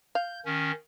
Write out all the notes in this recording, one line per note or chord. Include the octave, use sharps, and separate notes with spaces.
F5 G6
D#3 C#4